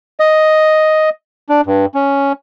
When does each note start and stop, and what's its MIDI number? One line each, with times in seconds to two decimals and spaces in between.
0.20 1.10 75
1.49 1.61 62
1.66 1.86 43
1.95 2.33 61